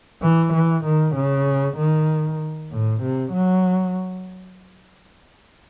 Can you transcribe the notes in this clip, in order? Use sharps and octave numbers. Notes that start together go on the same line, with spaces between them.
E3
E3
D#3
C#3
D#3
A2
C3
F#3